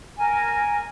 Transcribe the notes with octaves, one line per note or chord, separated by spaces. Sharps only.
A#4 G#5